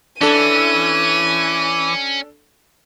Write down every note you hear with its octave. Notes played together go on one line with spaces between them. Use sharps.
E3 C#4 D4 A4 D#7